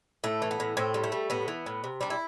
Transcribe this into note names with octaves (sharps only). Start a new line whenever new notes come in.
A2 A3
E3
B3
A2
A2 C4
G3
A3
G3
A2 B3
E3
A2
C3
G3 D4
E4